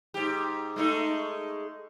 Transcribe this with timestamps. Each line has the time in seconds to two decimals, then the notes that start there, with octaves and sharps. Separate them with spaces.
0.14 G#2 G4
0.76 G#3 A3 D#4